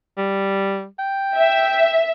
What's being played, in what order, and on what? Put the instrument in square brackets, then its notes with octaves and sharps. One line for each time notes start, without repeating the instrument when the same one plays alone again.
[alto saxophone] G3
G5
[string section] E5